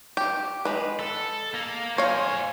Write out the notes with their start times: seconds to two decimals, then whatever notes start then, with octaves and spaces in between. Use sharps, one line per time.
0.17 G4
0.65 G#3 B4
0.99 A4
1.54 A#3
1.98 C5 C#5 F5 G#5